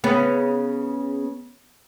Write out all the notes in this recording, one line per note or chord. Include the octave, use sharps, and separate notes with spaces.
C#3 B3